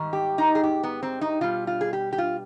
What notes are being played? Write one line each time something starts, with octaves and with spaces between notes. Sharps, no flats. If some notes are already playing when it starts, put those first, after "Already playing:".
Already playing: G#2 D#3 G3
G4
D#4
G#4
G4
B3
C4
D#4
B2 G3 F4
F4
G#4
G4
G4
F4